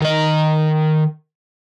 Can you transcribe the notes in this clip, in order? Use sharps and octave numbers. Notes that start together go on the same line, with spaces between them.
D#3 D#5